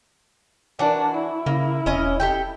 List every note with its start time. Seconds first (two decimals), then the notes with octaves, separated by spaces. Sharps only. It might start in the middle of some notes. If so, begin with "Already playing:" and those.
0.79 E3 D4 F#4 A#4
1.14 E4
1.46 C#3 A#3
1.86 E1 C#4 D#5
2.20 G4 A4 G5